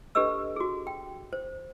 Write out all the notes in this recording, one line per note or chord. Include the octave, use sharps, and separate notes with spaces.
D4 G4 A4 B4 D#5 E6
F#4 G#4
G5
C5